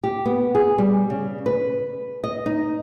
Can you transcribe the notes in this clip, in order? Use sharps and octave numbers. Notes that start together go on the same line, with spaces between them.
G4
B3
G#4
G3
C#3
B4
D#5
D#4